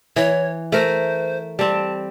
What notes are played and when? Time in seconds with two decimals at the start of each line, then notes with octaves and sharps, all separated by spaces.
0.16 E3 C#5
0.72 A3 A#4 C5
1.59 G3 C4 A5